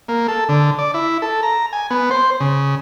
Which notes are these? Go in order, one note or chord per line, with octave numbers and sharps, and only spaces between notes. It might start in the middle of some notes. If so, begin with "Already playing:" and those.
A#3
A4
D3
D5
E4
A4
A#5
G#5
B3
C5
C#3